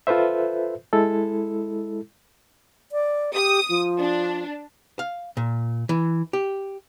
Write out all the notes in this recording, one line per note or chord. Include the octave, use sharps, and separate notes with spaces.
F4 A4 B4 C5 E5
G#3 E4 A4
D5
G4 D#6
F3
D4
F5
A#2
E3
G4